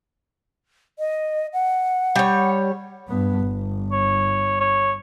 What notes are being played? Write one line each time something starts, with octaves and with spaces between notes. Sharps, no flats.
D#5
F#5
G3 C#5
G2 B3
G1
C#5
C#5